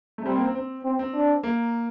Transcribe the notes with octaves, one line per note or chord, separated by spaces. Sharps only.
A3
G3 C4
A#3
C4
C4
C4
C4
D4
A#3